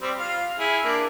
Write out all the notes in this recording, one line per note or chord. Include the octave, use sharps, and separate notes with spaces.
G3 C4
F4 F5
E4 G#4
A#3 D4